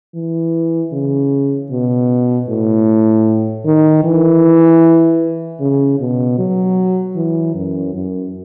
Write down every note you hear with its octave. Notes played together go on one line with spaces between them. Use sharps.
E3
C#3
B2
A2
D#3
E3
C#3
B2
F#3
E3
F#2
F#2